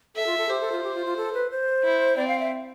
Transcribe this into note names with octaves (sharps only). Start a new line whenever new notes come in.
A4 E5
F4
A4
G4 C5
A4
F4
G4
F4
F4
A4
B4
C5
E4
C4 D5
F5
E5